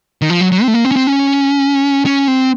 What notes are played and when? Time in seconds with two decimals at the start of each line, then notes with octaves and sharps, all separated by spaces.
0.22 D#3
0.30 F3
0.41 F#3
0.52 F#3
0.63 C4
0.68 A3
0.74 A#3
0.85 C4
0.91 C#4
0.96 C4
1.07 C#4
2.06 C#4
2.28 C4